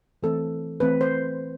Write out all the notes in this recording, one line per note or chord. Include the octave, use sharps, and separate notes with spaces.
E3 A3 C4 A4
E3 A3 C4 B4
C5